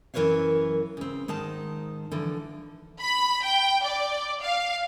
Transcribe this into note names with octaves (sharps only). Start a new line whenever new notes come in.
F#2 E3 A#4 B4 C#5 F5
C#3 C4
G#2 D#3 D#4 C5 A5
D3 E3 F3
B5
G5
D5
F5